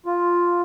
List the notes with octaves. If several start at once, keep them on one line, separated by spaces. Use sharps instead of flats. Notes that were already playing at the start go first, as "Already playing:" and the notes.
F4